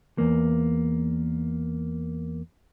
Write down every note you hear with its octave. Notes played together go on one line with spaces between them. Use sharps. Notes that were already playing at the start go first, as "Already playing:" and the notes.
E2 A#3